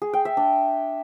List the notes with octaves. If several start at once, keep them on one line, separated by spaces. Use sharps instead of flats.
G#4
G5
E5
D4